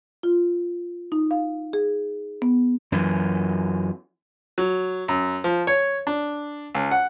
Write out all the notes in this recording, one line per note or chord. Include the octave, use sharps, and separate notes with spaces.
F4
D#4
F5
G#4
B3
F#2 E3
F#3
F#2
F3
C#5
D4
C#2
F#5